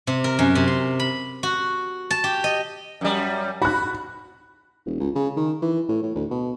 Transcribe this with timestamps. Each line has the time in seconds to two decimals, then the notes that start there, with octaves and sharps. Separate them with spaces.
0.07 C3
0.24 A#4
0.39 F#2
0.55 C3
0.68 C6
1.00 B5
1.43 F#4
2.11 A5
2.24 G4
2.44 D#5
3.01 F#2 G3
3.62 F#4 B5 F#6
4.86 E1
5.00 C#2
5.15 C#3
5.36 D#3
5.62 E3
5.89 A2
6.03 A2
6.15 D2
6.31 B2